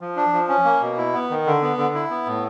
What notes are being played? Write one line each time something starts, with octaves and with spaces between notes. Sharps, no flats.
F3
D4
F3
C#4
A#3
B2
E4
B3
D#3
D3
B3
D3
E4
B3
A2